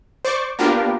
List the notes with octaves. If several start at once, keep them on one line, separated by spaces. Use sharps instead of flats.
C5 D5 C#6 D6
A#3 B3 D4 F4 G4 A#4